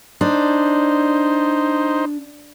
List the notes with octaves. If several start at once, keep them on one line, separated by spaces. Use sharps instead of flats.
D4 D#4 C5